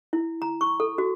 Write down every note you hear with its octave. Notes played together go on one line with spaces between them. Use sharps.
E4
A#5
C#6
A4
F#4